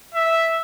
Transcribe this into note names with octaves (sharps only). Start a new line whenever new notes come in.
E5